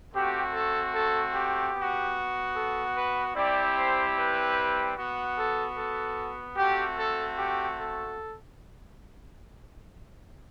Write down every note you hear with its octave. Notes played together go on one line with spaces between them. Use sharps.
A3 C4 F#4 G4
A4
A4
G4
B3 F#4
A4
B4
G3 C4 E4 G4 D5
C5
B4
B3 F#4
A4
A4
A3 C4 F#4 G4
A4
G4
A4